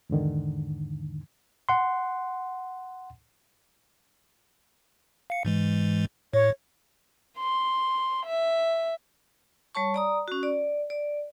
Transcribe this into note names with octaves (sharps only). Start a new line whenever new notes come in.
E2 G#2 D3 D#3
F#5 C6
F5 C#7
G#2 E3 G#3
A2 C#5
C6
E5
G3 C#5 A5 C#6
D5 A#5 D#6
C#4 F#4
D5
D5